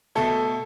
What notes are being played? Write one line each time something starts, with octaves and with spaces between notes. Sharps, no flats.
B2 A3 A4